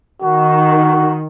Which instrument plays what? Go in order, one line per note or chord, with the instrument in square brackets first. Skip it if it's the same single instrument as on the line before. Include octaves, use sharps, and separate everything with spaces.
[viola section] D#3 [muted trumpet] F#4